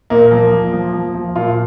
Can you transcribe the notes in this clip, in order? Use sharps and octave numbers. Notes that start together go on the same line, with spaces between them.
A#2 A#3
F3 A#3
F3
F3
F3
F3
A#2 F4